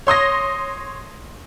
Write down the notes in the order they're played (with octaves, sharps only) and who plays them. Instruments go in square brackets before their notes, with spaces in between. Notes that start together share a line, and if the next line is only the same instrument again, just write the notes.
[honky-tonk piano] C#5 C6 D#6 A#6